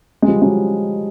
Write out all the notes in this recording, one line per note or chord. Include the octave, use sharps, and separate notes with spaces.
G#3
F3 G3
F#3 G#3